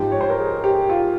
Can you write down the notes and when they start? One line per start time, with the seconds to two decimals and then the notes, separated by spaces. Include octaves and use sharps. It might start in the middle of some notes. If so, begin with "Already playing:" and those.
Already playing: G#2 F3 G4
0.12 C#5
0.21 C5
0.30 A#4
0.39 G#4
0.64 G4
0.89 F4